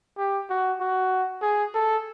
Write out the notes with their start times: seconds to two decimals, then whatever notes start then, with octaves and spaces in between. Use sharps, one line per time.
0.18 G4
0.50 F#4
0.81 F#4
1.42 G#4
1.74 A4